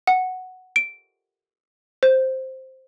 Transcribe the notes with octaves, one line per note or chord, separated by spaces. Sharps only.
F#5
D7
C5